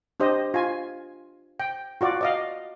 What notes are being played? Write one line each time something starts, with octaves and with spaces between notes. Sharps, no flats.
D4 G4 C5 D#5
F4 G#5
G5
F4 F#4 D5
D5 D#5 F5